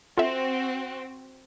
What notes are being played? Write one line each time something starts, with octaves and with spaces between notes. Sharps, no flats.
C4 F4 F#4 A4 E5